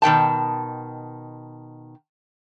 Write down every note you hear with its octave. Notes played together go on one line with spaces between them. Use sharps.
B2 D#3 G5 A5